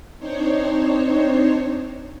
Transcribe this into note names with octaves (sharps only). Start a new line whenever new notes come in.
C4 D4 D#4 C5 C#5